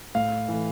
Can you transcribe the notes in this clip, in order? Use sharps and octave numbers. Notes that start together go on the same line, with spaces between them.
A2 F5
E3 A3